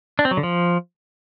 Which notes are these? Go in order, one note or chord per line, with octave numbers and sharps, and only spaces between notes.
D4
C4
F#3
D3
F3